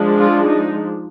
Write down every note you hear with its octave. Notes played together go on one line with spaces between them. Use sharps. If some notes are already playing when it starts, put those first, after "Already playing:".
Already playing: F3 G#3 D4
F4
D#4